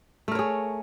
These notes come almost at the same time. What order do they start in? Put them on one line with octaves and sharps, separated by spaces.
A3 A#4 C#5 G#4